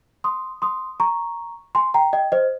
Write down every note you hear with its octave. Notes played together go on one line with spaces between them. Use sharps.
C6 D#6
C6 D#6
A#5 C#6
G#5 C6
G5 A#5
D#5 G5
C5 D#5